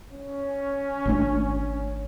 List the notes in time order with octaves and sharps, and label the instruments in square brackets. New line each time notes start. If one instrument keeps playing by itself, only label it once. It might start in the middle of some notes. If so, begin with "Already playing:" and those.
[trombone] C#4
[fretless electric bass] G#1 A3 D4